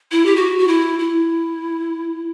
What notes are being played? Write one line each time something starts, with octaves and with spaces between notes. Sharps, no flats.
E4
G4
F#4
F#4
E4
E4